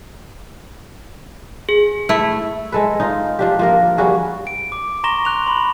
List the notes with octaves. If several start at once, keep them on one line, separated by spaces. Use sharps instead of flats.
G#4
A3 E4
G#3 A4 B4
D#4 F4
F3 D4 G4
F3 A#3 A#4
G3 A#3 F#4 G#4
D7
D6
A#5 C6 C#6 A#6 E7 G7
F#6 F7
B5 C6